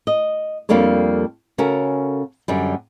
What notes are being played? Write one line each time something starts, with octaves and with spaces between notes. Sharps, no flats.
D#5
F2 G3 A#3 D4 A4 C#5
C#3 C#4 F#4 A4 A#4
F#2 D3 G3